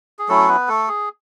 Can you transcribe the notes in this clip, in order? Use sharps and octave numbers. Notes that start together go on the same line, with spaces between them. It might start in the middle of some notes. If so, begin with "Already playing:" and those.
G#4
F#3 A3 C#4 E4 A4
B3 B4
A3 A4
G#4